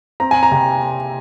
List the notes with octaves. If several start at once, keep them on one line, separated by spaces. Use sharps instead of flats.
C4 A#5
G#5
A#5
C3